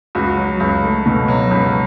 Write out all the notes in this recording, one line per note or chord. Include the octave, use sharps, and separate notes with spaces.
C#2 F#4
F#3
C#2
A3
B2
F#3
C#2